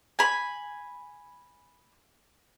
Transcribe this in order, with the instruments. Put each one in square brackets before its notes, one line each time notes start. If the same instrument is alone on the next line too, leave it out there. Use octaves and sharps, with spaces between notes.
[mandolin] G#5 B5